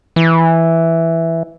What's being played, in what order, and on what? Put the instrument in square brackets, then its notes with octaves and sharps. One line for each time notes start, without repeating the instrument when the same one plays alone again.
[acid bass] E3